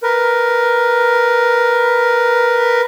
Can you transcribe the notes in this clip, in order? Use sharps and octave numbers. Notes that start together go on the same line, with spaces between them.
A#4 B4